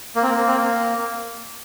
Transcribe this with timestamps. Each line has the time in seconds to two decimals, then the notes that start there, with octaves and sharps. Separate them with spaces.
0.15 A#3
0.23 C4
0.30 A#3
0.47 C4
0.57 A#3